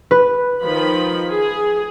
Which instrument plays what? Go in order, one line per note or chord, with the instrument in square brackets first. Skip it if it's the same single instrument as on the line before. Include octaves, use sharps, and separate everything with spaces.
[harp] B4
[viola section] D#3 F3 B5
G#4